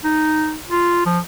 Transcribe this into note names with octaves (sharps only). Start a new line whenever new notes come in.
D#4
F4
F3